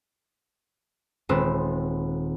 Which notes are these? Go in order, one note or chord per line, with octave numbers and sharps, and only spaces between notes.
D#1 G#3 C4 B4 E6